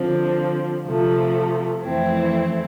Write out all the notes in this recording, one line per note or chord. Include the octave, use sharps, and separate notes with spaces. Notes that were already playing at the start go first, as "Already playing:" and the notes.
Already playing: D3 F3 C4
C3 F3 A3
F2 E3 A3 C4 E4